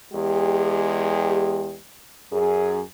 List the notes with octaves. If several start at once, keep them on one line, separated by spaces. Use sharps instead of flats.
E2 G#3 G4
F#2 G#4